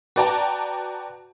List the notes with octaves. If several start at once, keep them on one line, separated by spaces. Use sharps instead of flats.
F#4 B4 D5 G5 A5 A#5